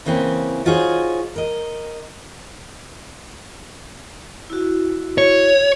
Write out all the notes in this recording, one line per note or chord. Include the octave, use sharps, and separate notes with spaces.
C#3 E3 A#3 C4 C#4
D#4 F4 F#4 G#4 C5 C#5
A#4 D#5
E4 F#4
C#5